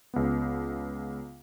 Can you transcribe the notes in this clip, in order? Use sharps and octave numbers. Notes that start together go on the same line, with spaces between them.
C#2 B3